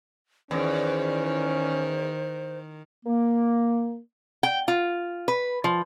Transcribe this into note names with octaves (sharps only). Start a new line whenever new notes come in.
E2 D#3 C#4 C5
A#3
G5
F4
B4
F3